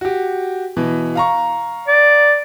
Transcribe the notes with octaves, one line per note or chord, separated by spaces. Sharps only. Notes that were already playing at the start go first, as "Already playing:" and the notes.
F#4 G4
B2 E3
F5 A#5 C#6
D5